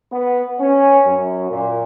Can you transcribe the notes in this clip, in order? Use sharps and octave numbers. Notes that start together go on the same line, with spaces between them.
B3
C#4
F#2
A#2